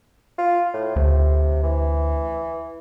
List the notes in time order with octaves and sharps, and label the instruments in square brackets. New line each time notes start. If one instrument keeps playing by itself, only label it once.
[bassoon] F4
A2
[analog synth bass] D2 [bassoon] C3
[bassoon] E3